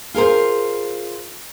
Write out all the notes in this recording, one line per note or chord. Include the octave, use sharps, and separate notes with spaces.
F4 G#4 A#4 C5